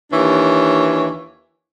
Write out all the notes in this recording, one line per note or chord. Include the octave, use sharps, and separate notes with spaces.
D#2 E3 D4 C#5